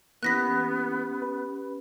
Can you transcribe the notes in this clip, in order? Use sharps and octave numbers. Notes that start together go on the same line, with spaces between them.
E3 A#3 B3 C#4 G4 F#6 A#6 B6
B4